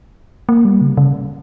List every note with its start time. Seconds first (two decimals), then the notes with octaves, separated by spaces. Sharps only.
0.49 A#3
0.65 G3
0.81 C#3
0.97 C#3